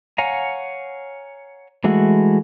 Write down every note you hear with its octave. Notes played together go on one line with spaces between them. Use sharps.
C#5 F5 F#5 G#5 A#5
E3 G#3 A3 E4 F#4